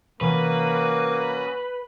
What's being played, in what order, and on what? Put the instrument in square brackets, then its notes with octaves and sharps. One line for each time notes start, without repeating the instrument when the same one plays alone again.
[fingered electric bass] C3 E3 [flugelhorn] A#3 [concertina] C#4 F#4 D#6 [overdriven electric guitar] B4